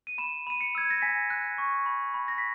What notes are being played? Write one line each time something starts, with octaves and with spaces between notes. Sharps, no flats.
D#7
B5 E7
B5 D#7
C#7
E6 G#6
A#6
G#5 B6
F#6
C#6
B5
B5
A#6
B6